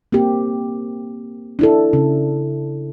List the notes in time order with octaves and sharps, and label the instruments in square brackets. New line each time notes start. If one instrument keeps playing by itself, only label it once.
[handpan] A#3 C4 G4
D4 E4 A4
C#3